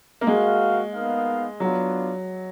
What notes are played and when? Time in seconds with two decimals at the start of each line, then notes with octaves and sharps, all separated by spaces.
0.21 A#3
0.27 G#3 F#4 A#4 F5
0.93 B3 D#4 A#4 F5
1.60 F#3 B3 D4 F4